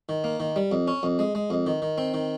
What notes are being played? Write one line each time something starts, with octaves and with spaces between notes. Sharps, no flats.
D#3
A#3
D#3
G3
F2
C#4
F2
G#3
G#3
F2
D#3
D#3
C4
D#3